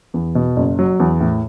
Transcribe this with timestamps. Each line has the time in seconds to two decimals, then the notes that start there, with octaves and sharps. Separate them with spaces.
0.14 E2
0.35 B2
0.56 F#1
0.79 F#3
1.00 E2
1.20 A2